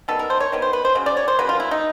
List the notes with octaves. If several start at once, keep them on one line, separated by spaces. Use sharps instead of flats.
D#3 G3 B3 A4
A#4
C5
C#5
D#3 G3 B3
C5
B4
C5
C#3 F#3
D5
C#5
C5
C#3 F#3 A#3 B4
F4
E4
D#4